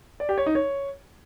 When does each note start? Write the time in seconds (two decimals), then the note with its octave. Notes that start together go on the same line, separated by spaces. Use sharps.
0.20 D5
0.29 G4
0.38 C#5
0.46 D#4
0.55 C#5